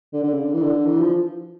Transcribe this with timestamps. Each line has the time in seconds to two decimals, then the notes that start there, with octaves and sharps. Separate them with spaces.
0.13 D3
0.23 D3
0.34 C#3
0.44 D3
0.54 E3
0.62 D3
0.86 E3
1.00 F3